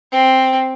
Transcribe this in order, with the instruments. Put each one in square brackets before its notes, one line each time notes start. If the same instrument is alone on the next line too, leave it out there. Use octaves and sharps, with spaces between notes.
[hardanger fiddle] C4